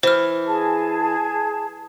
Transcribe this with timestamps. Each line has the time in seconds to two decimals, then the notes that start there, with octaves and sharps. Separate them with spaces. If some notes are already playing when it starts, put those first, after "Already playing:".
0.03 E3 C5 F6
0.46 G#4 A5